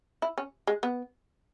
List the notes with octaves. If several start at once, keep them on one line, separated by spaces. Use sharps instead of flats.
E4
C#4
G#3
B3